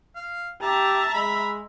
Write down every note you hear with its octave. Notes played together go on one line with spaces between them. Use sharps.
F5
G4 E5 A5 A#5
G#3 B5